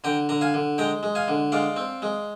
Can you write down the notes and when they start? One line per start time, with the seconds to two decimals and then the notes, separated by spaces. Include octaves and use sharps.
0.04 D3 G5 A#5
0.29 D3 A#5
0.41 F5 G#5
0.54 D3
0.78 G#3 G5 A#5
1.03 G#3
1.15 F5 G#5
1.28 D3
1.52 G#3 D5 F5
1.76 C4
2.02 G#3